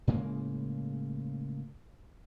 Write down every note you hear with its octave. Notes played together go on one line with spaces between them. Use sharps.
A2 C#3 G#3 A#3